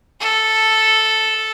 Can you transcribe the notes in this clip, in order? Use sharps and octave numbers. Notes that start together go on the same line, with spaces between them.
A4